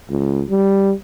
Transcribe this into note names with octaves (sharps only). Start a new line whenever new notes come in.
C#2
G3